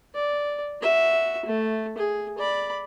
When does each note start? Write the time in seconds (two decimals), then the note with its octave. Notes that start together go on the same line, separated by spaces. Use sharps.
0.15 D5
0.82 F#4 E5
1.46 A3
1.98 G#4
2.38 D5 B5